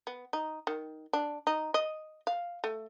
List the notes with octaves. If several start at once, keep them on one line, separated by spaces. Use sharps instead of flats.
B3
D#4
D#3
D4
D#4
D#5
F5
A3